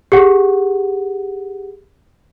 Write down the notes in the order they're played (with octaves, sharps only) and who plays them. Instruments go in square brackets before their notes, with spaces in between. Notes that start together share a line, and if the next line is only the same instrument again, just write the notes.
[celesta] G4 G#4 F#5